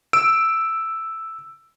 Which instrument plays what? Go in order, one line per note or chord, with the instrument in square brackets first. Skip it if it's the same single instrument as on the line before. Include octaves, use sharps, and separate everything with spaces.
[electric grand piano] E6 D7